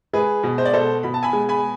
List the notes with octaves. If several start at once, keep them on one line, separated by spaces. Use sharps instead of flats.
G#3 G#4 B4
B2
C5
D5
B2 A4 C5
B2 B5
A5
G#5 B5
G#3
G#5 B5